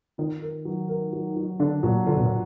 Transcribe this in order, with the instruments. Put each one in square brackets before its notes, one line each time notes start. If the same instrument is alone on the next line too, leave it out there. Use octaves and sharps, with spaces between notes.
[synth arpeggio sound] D#3 [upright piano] F4
[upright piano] A#4
F#3
A#4
F#3
F#3
[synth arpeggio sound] D3 [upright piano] D4
[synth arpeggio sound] A#2 [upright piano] F#3
[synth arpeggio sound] D3 [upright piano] F4
[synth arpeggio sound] B2
A#2